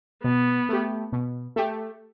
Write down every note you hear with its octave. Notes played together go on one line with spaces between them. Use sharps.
B2 B3
A3 G4
B2
A3 G4